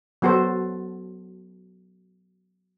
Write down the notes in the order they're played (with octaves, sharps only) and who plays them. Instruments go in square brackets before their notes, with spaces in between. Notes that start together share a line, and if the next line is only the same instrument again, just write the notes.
[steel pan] F#3 B3 F#4 A4 C5